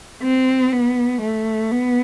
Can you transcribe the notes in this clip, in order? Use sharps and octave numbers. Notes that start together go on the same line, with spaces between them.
C4
B3
A3
B3